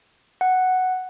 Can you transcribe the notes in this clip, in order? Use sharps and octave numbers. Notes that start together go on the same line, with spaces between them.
F#5